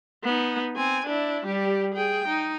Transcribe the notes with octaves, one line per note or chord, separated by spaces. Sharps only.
B3 D#4
C4 G#5
D4 E4
G3 G4
G#4 G5
D#4